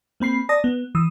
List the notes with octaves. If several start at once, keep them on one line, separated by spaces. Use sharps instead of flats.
A#3 C4 B5 C7
D5 A5 D#6 A#6
B3
E3 D#6 E6